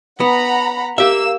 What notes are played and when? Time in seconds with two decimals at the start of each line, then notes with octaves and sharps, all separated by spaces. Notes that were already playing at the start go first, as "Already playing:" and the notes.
0.20 B3 F#5 A#5 B5
0.98 A#3 G4 E5 E6